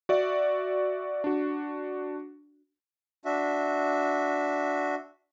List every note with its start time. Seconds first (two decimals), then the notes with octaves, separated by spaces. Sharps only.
0.09 F#4 D5 E5
1.24 D4 F#4
3.25 D4 F#4 E5